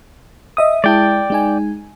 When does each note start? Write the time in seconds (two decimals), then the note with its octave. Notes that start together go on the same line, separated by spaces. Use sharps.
0.57 D#5 E5 D#6
0.84 G#3 E4 D5 G5 A5
1.30 G#3 D#4 G#5